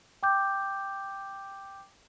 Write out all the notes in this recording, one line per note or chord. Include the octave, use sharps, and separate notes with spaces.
G5 D6 G6